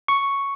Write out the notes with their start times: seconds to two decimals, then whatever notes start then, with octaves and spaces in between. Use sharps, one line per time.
0.08 C#6